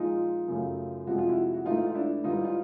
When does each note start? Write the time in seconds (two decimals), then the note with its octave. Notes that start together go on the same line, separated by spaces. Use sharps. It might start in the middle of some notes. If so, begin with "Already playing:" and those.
Already playing: A#2 F3 G#3 D#4 F4
0.48 F#2 C#3 F#3 A3
1.07 F2 C3 F3 G#3 F#4
1.18 F4
1.29 E4 F#4
1.54 F#4
1.65 G#2 E3 A3 D#4 F4
1.87 F4
1.95 D4 E4
2.24 G#2 E3 G3 D#4 F4
2.44 F4